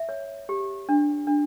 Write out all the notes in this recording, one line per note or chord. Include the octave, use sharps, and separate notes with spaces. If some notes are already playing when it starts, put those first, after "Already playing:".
Already playing: E5
C#5
G4
D4
D4